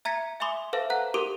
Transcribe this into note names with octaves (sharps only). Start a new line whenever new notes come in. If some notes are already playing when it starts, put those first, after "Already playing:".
E5 A#5 G#6 B6 C#7
E5 G#5 B5 C6 D6 D#6
A4 B4 C5 E5 F5 A5
F#5 A#5 F#6
G4 A#4 D6 D#7